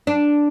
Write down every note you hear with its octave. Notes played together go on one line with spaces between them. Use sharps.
D4